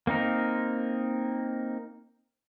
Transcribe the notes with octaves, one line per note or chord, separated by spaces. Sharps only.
A#3 C4 D#4 A#4